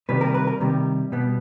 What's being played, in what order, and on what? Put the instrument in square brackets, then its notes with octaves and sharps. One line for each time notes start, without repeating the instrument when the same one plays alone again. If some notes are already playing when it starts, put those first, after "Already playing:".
[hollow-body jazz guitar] C3 D#3 G3 A#3 B4
A#4
B4
A#4
C3 D#3 G3 A#3
B2 G3 B3